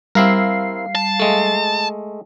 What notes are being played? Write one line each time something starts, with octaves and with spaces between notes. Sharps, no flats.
G3 C4 E4 A#4 F5 C7
A5
G#3 A3